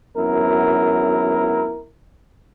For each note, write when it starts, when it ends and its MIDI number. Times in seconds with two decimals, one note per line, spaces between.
0.17 1.87 32
0.17 1.87 42
0.17 1.87 59
0.17 1.87 64
0.17 1.87 70